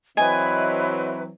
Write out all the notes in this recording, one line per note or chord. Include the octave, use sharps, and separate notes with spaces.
E3 F#3 C4 B4 D#5 E5 G#5